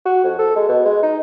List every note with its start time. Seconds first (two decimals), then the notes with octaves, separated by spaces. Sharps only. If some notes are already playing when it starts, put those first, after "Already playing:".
0.06 F#4
0.24 F2
0.39 A4
0.56 G#3
0.68 B2
0.85 G#3
1.03 D#4